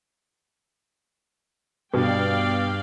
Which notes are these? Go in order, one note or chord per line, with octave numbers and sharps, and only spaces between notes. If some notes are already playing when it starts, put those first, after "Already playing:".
G2 B2 D5 F5 G5